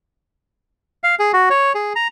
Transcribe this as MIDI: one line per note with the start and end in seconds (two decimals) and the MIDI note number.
1.04 1.15 77
1.19 1.32 68
1.33 1.49 66
1.50 1.73 73
1.75 1.93 68
1.96 2.08 82